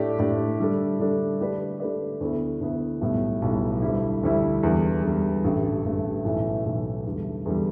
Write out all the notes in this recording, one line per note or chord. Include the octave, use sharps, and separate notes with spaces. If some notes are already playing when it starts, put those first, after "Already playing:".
Already playing: A2 A3 D4 G4 D5
A2 A3 D4 G4 D5
D3 G3 D4 A4
D3 G3 D4 A4
D3 A3 G4 B4 D5
D3 A3 G4 B4 D5
D2 D3 B3 E4 A4
D2 D3 B3 E4 A4
B1 A2 G3 B3
B1 A2 G3 B3
D2 D3 G3 E4
D2 D3 G3 E4
E2 D3 G3
E2 D3 G3
A1 G2 D3 A3
A1 G2 D3 A3
B1 A2 E3 A3
B1 A2 E3 A3
E2 D3 G3
E2 D3 G3